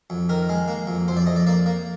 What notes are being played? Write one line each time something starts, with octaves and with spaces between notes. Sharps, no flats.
F2
D#3 A#4
G#3
A#3
F2
F2 C5
D5
F2 D#5
D5
A#3 D5
A#3